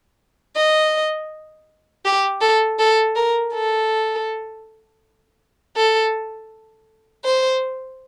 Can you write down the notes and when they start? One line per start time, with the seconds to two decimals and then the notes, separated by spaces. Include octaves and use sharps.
0.56 D#5
2.05 G4
2.41 A4
2.79 A4
3.15 A#4
3.53 A4
5.76 A4
7.24 C5